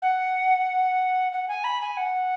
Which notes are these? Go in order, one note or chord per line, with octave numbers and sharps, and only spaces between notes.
F#5
F#5
G#5
B5
G#5
F#5